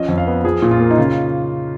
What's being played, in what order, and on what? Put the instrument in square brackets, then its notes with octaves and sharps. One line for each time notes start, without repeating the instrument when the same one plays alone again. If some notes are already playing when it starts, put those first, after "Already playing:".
Already playing: [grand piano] F3 C#4 D#5
F2
F5
B3
F3 G#4
A#2
F4
A#3
D#4
C#3 F4